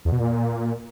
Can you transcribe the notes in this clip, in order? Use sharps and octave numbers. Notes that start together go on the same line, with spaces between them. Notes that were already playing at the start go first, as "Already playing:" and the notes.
E2
B2
A#2